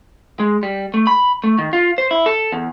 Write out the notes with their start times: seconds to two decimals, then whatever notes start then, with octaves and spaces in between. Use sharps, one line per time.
0.40 G#3
0.63 G3
0.94 A3
1.07 B5
1.44 A3
1.59 D#3
1.73 F4
1.98 C5
2.11 E4
2.26 A4
2.52 E2